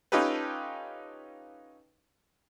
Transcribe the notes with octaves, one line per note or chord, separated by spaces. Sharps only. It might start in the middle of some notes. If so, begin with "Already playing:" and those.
C#4 D#4 F4 G4 A4 B4